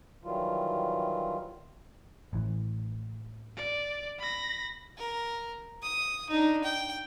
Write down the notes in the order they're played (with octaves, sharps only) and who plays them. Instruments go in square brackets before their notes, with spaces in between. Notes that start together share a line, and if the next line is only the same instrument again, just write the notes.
[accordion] D#3 E3 F#3 G3 F4
[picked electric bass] A1 E3
[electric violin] D5
B5 A#6
[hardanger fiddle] A#4
D#6
D4 D#4
G5